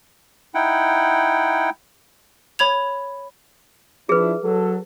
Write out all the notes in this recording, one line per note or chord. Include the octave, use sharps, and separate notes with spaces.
D#4 E4 F#5 G5
C#5 B5 G#6 F7
F3 D4 E4 G#4 B4
F#3 A4